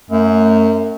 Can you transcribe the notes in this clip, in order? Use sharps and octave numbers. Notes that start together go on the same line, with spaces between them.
F#2 A3